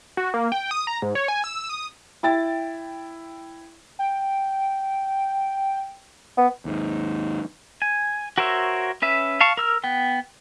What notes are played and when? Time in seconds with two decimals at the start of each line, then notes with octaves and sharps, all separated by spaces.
0.17 F#4
0.34 A#3
0.52 G5
0.71 D#6
0.87 A#5
1.02 G#2
1.15 C#5
1.28 G#5
1.44 E6
1.69 D#6
2.23 E4 G5 A6
3.99 G5
6.38 B3
6.65 D#2 G#2
7.82 G#5
8.38 F#4 A#4 C5 C#5 E5
9.02 C#4 B4 E5
9.41 F5 A5 C#6
9.57 A#4 E6 F6
9.84 B3 G5